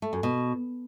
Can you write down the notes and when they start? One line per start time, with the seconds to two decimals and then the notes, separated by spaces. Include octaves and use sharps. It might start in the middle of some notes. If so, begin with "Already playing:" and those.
0.02 A3
0.13 F#2
0.23 B2